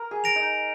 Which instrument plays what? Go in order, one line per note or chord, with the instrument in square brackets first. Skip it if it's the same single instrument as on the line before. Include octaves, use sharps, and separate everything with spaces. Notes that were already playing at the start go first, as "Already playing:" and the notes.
Already playing: [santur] A#4
G#4
[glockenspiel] A#6 D7 F7
[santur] D#4